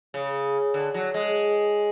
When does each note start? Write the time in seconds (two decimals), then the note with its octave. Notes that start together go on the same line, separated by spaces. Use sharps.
0.14 C#3
0.74 D3
0.94 F#3
1.14 G#3